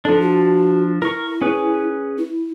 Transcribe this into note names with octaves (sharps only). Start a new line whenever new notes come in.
F3 D4 A4
F#4
E4 A#4 C#6
C#4 G#4 B4
E4